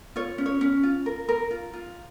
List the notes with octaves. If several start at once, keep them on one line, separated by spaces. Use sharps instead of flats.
F4 C#5
C#4
C#5
C#4
F4
A#4
A#4
F4
F4